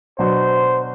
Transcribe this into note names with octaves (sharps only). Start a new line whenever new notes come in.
B2 F#3 B3 D4 F#4 C5